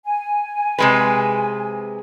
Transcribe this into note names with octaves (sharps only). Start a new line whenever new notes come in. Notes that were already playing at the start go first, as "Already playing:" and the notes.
G#5
C3 G#3 B4